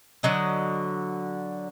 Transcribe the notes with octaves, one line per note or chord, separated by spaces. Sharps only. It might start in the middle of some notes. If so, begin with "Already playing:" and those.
D3 F#3 D#5